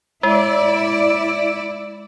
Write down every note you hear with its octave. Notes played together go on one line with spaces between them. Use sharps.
G#3 E4 D5